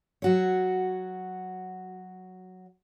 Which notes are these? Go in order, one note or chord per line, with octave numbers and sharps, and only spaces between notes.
F#3 F#4 C#5